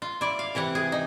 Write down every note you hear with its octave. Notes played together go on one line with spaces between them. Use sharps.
F4
E4 D5
F5
C3 E3 E4 F#5
G#4
D#4